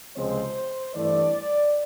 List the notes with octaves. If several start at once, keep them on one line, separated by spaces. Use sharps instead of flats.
C#2 C3 F3 G#3 C4 C5
G2 E3 A3 C4 D5